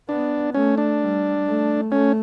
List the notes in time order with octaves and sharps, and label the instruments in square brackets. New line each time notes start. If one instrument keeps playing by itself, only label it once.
[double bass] B3 [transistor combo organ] D4
[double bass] A3 [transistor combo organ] C#4
[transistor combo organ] D4
[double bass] G3
A3
[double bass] A3 [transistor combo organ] C#4